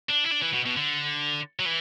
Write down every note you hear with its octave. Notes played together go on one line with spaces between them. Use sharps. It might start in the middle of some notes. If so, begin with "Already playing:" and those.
D4
E4
D4
E3
B2
B2
D3
F#3
E3